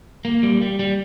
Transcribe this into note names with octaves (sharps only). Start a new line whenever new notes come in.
A#3
G3
G3
G3